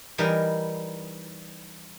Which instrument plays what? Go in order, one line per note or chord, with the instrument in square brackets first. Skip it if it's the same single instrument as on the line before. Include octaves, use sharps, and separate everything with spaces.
[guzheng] E3 G3 D#4 A#4